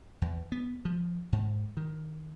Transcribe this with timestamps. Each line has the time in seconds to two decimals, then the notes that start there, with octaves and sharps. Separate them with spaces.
0.22 E2
0.52 B3
0.85 F3
1.32 G#2
1.77 D#3